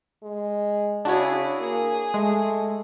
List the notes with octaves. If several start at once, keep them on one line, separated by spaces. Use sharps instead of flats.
G#3
C#3 D4 E4 F#4 G#4 C#5
A#3 G#4
G#3 A3